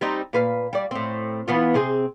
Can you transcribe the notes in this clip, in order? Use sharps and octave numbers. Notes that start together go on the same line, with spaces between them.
G3 C4 D#4
A#2 B4 F5
G3 D5
A2 C4
E3 B3 F4
C3 C4 G#4